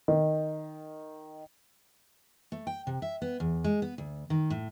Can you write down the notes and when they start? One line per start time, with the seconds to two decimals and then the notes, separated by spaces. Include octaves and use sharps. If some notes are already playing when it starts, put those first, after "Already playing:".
0.08 D#3
2.52 A3
2.67 G5
2.87 C3
3.02 E5
3.22 B3
3.40 E2
3.64 G#3
3.82 B3
3.98 D2
4.30 D#3
4.50 A2